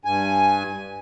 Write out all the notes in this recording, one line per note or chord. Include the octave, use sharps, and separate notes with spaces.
G2 G#5